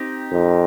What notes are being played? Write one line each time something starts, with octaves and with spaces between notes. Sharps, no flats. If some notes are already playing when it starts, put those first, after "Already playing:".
Already playing: C4 D#4 G4
F2